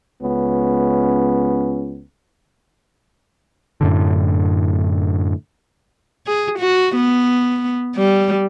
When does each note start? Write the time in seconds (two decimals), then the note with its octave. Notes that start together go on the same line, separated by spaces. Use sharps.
0.22 C#2 B3 C#4
3.81 F#2 A2 D3
6.27 G#4
6.59 F#4
6.96 B3
7.96 G3